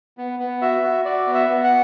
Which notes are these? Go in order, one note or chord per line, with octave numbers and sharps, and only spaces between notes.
B3
B3
F#4 E5
F#4
F#4 D5
B3
E5
B3
F#5